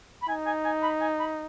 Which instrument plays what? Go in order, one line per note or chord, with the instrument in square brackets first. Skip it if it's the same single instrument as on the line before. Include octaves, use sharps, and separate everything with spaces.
[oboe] B5
[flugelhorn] D#4 [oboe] G#5
[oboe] G#5
G#5
B5
G#5
B5